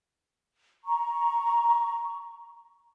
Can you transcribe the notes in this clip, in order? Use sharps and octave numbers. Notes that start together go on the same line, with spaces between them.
A#5 C#6